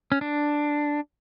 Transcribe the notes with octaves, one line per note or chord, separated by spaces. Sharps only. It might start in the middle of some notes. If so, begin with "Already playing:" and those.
C#4
D4